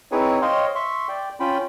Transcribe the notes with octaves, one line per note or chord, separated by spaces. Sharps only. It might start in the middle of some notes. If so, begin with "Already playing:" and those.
C4 D#4 E4 G#4 B4 C#5
C5 C#5 D#5 F5 G5 C6
E5 C6 C#6
D5 G5
C#4 F4 G5 B5